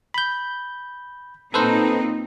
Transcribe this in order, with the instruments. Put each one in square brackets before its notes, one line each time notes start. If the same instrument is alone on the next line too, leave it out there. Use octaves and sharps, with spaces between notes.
[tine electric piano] B5 G6
[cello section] A#2 C4 D#4 [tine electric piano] A4 B4 C5